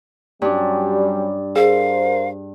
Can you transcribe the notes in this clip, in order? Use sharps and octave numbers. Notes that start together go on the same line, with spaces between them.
G2 F#3 G3 C#4 D4
G#4 A#4 C5 F5